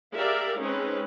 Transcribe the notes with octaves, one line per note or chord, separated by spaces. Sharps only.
G4 G#4 A#4 D5 E5 F5
G#3 C4 C#4 D#4 G#4 B4